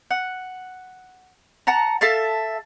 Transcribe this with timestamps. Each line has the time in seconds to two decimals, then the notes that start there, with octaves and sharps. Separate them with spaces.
0.11 F#5
1.67 F#5 A5 A#5
2.01 A4 E5 F5 A5